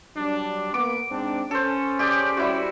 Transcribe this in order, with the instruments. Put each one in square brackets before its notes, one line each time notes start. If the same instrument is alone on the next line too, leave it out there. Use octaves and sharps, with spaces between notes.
[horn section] F#3 G3 D4
[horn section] A#3 B3 [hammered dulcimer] D6
[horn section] G#2 C4 D4
[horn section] C#4 [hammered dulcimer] A4 C5
[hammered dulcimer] G4 G#4 D5
G3 E4 F#4